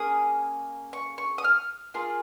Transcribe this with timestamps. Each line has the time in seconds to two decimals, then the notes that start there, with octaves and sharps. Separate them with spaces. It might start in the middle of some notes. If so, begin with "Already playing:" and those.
Already playing: A#3 C#4 G#4 D#6
0.93 C#6
1.18 C#6
1.38 D#6
1.44 F6
1.94 A#3 F4 G#4